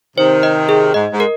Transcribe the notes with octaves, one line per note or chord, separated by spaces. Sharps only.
C3 D#3 C5
D#5
G#4
G#2 D#5
G#2
A#4